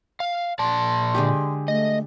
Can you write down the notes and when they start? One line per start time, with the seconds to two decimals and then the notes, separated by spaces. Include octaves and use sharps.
0.20 F5
0.59 A#2 D5 A5 C6
1.14 D3 G#3 G4
1.68 A3 D#5